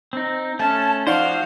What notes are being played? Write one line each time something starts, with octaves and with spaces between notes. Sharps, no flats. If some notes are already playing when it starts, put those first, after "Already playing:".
C4 D#4
A3 C#4 A5
F3 D#4 F#4 C5 D5 F5 F#5